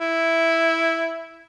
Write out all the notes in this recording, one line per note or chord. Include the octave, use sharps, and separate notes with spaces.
E4